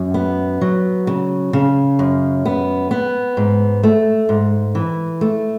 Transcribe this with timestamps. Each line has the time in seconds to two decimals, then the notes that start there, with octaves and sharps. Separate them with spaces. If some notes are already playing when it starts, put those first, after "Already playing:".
Already playing: F#2
0.14 B3
0.61 F#3
1.07 C#3
1.53 C#3
1.99 F#2
2.45 B3
2.91 B3
3.37 G#2
3.83 A3
4.29 G#2
4.75 E3
5.21 A3